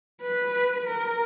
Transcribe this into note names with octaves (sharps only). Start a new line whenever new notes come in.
B4
A#4